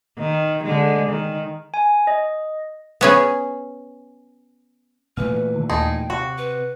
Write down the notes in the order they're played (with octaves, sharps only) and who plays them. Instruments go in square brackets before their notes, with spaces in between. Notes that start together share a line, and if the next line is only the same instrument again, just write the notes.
[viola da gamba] D#3
D3 G#3
D#3
[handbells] G#5
D#5
[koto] B3 C#4 G#4
[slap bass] A#2 E3 A3 [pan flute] B4 [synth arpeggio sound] F6
[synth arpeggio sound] D#3
[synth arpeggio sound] D#2 D#5 A5 [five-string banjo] D#4 G#4 [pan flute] G5
[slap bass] C3 [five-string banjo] F#4
[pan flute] B4